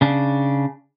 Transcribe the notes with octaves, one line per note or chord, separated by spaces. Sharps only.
C#3 D4